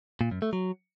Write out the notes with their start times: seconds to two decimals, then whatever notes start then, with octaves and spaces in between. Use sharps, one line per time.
0.21 A#2
0.31 F#2
0.42 A3
0.53 F#3